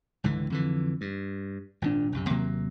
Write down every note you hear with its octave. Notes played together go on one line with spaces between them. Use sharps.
C#2 G#2 D3 E3
F2 D3 E3
G2
G#1 G2 A#2 D4
B1 F#2 C3
D#2 C3 F#3 A#3